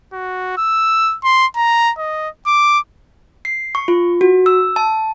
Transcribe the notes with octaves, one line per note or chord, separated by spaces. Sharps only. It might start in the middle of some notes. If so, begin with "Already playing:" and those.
F#4
E6
C6
A#5
D#5
D6
C7
C#6
F4
F#4
E6
A5